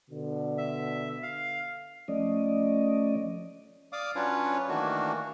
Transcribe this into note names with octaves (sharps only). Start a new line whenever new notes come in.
B2 D3
E5
F5
F3 A3 C#4 D5 D#5
D5 F5 D6 D#6
F#3 C#4 D4 F4 B4 C#5
D#3 E3 A3 A#3 D4 F#4